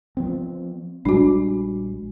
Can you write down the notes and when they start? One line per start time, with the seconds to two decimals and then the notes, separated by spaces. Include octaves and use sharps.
0.17 F3 B3 C4
1.05 A#1 G3 G#3 D4 F#4